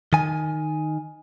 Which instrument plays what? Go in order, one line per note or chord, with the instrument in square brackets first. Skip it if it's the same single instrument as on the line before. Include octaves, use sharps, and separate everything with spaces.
[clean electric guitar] D#3 G#5